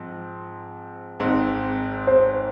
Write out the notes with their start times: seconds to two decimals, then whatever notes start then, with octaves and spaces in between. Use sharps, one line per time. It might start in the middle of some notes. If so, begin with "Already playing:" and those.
Already playing: G#2 F3 C4
1.20 G#1 G#2 G#3 C4
2.07 C5